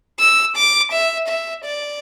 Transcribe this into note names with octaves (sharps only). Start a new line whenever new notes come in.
E6
D6
E5
E5
D5